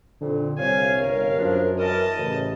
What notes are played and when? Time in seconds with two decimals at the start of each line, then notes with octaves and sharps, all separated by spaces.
0.21 F2 A#2 D3
0.59 C2 C#5 F5 G#5
1.02 G1 A#4
1.39 F#2 F3 D4
1.79 E3 A#4 D#5 A5
2.17 A1 C#3